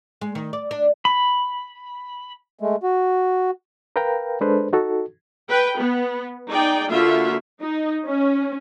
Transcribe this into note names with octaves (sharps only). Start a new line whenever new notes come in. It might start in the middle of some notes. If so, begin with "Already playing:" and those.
G#3
D#3
D5
D4
B5
G#3 A3
F#4
A#4 B4 F5 G5 A#5
G#3 D4 A4 B4 C5
D#4 F#4 A4
B4 G5
B3
D#4 G#4 D5 G5
D3 A#3 F4 F#4 E5 F5
D#4
C#4